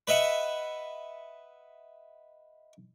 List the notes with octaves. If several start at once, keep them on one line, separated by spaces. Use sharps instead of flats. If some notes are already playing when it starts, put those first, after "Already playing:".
B4 D#5 E5 F#5